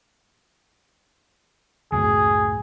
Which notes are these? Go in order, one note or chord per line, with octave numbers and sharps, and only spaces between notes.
C#2 F#2 A2 G#4